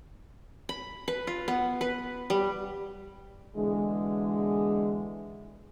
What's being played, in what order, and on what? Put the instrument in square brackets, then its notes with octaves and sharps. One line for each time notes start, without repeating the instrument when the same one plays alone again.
[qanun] B5
B4
F4
B3
B4
G3
[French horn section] B2 D3 E3 G#3